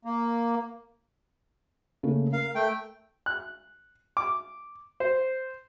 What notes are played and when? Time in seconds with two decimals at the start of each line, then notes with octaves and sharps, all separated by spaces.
0.05 A#3
2.03 C#3 A3 A#3
2.33 A#4 F5
2.55 A3 G5
3.26 F#6
4.17 D6
5.00 C5